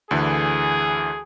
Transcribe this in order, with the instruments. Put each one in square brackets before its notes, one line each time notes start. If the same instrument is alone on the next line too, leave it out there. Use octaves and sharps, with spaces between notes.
[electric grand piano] D2 D3 E3 [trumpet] G#4